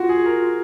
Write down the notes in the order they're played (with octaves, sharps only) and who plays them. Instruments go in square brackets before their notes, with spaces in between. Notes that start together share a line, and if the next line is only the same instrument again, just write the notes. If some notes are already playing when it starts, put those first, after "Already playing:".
Already playing: [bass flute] F4 [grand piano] F#4
[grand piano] G#4
A#4